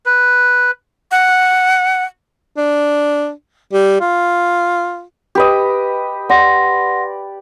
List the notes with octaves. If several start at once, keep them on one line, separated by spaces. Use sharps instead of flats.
B4
F#5
D4
G3
F4
G4 B4 D#5
D5 F#5 C6 A#6